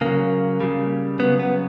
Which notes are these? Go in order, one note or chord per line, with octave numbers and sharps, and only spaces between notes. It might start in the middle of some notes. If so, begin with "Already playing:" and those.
C#3 F#3 A#3
C#3 G3
C#3 F#3 B3
B3